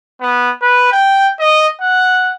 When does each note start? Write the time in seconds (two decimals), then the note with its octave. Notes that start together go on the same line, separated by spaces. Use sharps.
0.21 B3
0.62 B4
0.92 G5
1.40 D#5
1.81 F#5